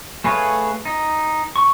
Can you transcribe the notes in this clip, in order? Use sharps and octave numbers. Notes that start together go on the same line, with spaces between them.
A3 G#4 B4 C#5 F5
D#4
C#6